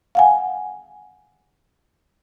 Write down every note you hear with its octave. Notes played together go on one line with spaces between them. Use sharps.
F5 F#5 G#5